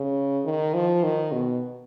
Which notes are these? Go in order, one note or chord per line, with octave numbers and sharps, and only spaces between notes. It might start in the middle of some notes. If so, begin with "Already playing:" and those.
Already playing: C#3
D#3
F3
D#3
B2